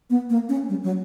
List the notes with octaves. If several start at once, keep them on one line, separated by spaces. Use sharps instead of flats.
B3
A#3
C#4
G3
F#3